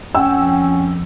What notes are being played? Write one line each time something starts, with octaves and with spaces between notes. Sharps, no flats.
F2 F3 C#4 F#5 G5 E6